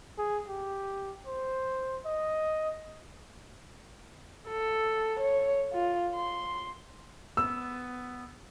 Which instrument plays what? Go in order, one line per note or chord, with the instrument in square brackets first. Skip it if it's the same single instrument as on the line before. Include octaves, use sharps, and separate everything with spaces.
[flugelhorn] G#4
G4
C5
D#5
[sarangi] A4
C#5
F4
C6
[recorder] B3 [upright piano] E6